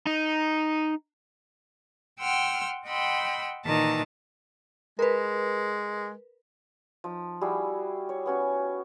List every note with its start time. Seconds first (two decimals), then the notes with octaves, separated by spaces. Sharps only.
0.07 D#4
2.20 F#5 G5 C6 E6 F6
2.85 D#5 F#5 G5 B5 C6 E6
3.65 A#2 D#3 E3 A5 A#5
4.99 G#3 A#4 B4
7.04 F3 D#4
7.41 G3 E4 F#4 G#4
8.09 C#5
8.26 B3 C#4 F#4